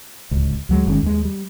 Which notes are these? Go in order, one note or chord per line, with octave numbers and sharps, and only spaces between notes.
D1 C#2
D2 F#3 G#3
G1 D#3 G#3 C#4
D#2 G#3
G3